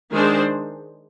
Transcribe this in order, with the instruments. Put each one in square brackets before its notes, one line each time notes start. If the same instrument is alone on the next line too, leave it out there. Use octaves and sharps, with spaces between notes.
[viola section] D#3 G#3 D4 G#4 C5